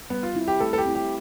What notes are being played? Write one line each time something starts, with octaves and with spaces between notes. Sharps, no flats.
G3 B3
F4
C4 E4
G4
A3 A4
A4
G4
C4 E4
G4